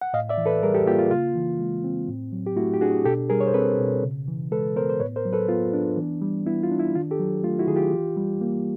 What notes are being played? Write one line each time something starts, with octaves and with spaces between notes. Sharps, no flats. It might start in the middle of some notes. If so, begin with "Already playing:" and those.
F#5
A2 D#5 F5
D5 E5
E3
A4 B4
G3 G#4 A#4
G4 A4
A#3 F4 G4
F4
C#3 F4
E3
G#3
C4
A2
F#3
G4
A3 E4 F#4
G4
D4 F#4 G#4
B2 G4 A4
G3 G#4 A#4
C#5
C5
C4 A4 B4
B2
C#3
E3
G#3 A4 B4
B3 A#4 C5
C5
A2 B4 C#5
A#4 C5
F#3
A4 B4
B3 F4
D4
E3
G3
B3 E4
F4
D4
E4
D#3 F4
G4 A4
F#3
A3 F4
E4 F#4
D#3 G#4
F4 G4
E3
G3
A#3